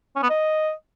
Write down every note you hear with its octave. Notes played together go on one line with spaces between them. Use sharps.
C#4
B3
D#5